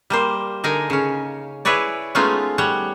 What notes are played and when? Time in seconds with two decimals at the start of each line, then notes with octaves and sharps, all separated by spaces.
0.10 G3 A#3 C5
0.64 D3 D#4 A#4 G#5
0.90 C#3 C#4
1.65 E4 G#4 B4 C#5 D5
2.15 G#3 A3 B3 C#4 D#4 F4
2.58 G3 C#5 F#5